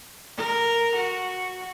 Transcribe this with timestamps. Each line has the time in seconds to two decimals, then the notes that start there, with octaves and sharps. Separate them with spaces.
0.37 A#4
0.96 F#4